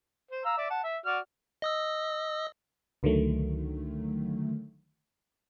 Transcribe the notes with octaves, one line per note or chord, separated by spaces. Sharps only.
C5
F5 A#5 E6
D5 E5
F#5 A5
E5
F#4 D5 F6
D#5 D#6 E6
C#2 D3 D#3 F#3 A3